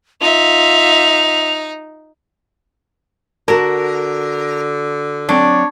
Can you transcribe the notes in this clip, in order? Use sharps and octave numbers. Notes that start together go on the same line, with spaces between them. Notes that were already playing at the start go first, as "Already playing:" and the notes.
D#4 F4 E5 F7
D3 F#4 A#4 A5
F#3 C4 D4 C#5